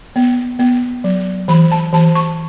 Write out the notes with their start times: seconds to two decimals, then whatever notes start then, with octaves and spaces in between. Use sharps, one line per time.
0.16 B3
0.59 B3
1.04 F#3
1.48 E3 B5
1.72 A5
1.93 E3 A5
2.15 C#6